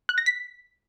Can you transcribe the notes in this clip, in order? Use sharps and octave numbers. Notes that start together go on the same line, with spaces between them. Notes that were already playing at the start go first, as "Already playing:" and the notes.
F#6
A#6
B6